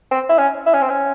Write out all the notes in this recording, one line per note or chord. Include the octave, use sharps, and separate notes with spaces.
C4
E4
C#4
E4
C#4
C4
C#4